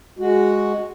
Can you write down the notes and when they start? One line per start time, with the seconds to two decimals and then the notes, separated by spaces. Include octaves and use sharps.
0.19 G#3 F#4